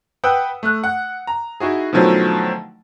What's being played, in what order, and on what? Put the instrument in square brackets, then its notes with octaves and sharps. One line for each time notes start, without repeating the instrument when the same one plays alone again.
[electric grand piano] B4 F#5 G5 D#6 E6
A3 F#6
F#5
A#5
D#4 E4 F#4 G#4
B2 D3 D#3 F3 F#3 A3